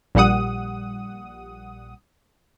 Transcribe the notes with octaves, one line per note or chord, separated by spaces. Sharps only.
A#1 A#2 G3 F#5 D#6